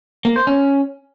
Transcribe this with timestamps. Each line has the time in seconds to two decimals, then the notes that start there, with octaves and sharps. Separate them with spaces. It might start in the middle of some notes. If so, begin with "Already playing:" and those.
0.25 A#3
0.36 C5
0.47 C#4